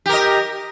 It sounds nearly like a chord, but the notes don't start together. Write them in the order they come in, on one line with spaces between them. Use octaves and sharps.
G4 A#4 D#5